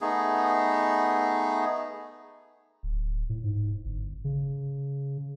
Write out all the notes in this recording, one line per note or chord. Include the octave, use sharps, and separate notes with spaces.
A3 B3 D#4 G#4
D1
A2
G#2
G1
C#3